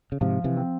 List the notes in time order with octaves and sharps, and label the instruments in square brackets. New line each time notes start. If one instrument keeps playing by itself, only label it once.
[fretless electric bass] C#3
[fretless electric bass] G#2 C3 [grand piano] F3
[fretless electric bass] C3 E3
[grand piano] C4